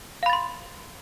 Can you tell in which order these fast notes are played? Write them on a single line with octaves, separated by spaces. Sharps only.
F5 B5 A6 C6